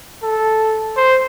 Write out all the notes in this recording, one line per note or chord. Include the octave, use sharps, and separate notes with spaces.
A4
C5